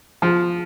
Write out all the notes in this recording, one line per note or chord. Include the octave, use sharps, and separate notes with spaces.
F3